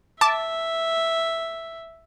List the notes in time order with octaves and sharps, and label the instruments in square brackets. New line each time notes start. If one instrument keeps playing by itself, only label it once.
[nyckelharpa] E5 [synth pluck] A5 D6